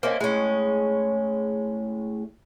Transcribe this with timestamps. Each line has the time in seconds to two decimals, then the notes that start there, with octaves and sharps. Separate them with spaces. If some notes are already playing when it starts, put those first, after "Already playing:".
0.03 A#3 C#4 C5 D#5 E5
0.20 A2 G#3 C#4